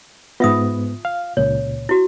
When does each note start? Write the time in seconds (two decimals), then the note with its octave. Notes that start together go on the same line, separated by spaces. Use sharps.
0.40 G#2 B3 F4 E5 D#6
1.05 F5
1.37 C#2 A#2 C#5
1.89 E4 F#4